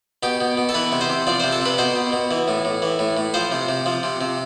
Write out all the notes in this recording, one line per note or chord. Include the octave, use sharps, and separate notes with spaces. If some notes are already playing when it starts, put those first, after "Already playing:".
B2 G4
B2
B2
A4
E3 B4
C3
C5
C3
F3 D5
C3 C5
A4
C3 B4
B2 C5
B2
B2
E3
A2
A2
E3
A2
A2
F3 C5
C3
C3
F3
C3
C3